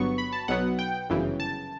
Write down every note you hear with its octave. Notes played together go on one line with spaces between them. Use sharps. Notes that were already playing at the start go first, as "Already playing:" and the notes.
Already playing: G1 G2 F#3 B3 C#6
B5
A5
B1 B2 F#3 B3 F#5
G5
G1 F#2 C#3 E3
A5